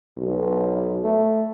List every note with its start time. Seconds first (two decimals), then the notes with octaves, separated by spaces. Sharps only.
0.18 B1
1.04 A3